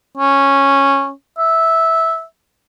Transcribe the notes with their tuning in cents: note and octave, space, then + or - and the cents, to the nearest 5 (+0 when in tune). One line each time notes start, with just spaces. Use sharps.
C#4 -10
E5 -10